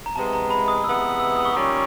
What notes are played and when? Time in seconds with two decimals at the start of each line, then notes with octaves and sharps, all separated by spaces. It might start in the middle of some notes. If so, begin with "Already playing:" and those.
0.06 A#5
0.16 C3 E3 G#3 B3 A5
0.33 A#5
0.51 B5
0.68 D#6
0.84 C3 E3 G#3 B3 E6
1.19 E6
1.36 D#6
1.45 C#6
1.53 D#3 G3 A#3 C#4 F4 D6